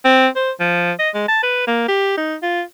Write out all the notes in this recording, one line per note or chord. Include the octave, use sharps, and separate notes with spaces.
C4
C5
F3
D#5
G#3
A5
B4
A#3
G4
D#4
F4